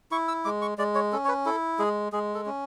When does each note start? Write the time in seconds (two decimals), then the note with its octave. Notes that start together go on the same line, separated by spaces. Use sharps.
0.12 E4 C#6
0.28 E6
0.45 G#3 D6
0.62 C#6
0.78 G#3 D5
0.95 C#5
1.13 C#4 A4
1.25 C#5
1.28 B4
1.46 E4 A4
1.79 G#3 G#4
2.13 G#3 G#4
2.35 A4
2.46 C#4